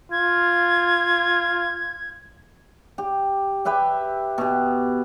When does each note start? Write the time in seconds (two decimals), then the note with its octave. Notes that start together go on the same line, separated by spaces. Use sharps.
0.12 F4 G#6
2.98 G4
3.65 G4 B4 E5 G5
4.38 B2 G4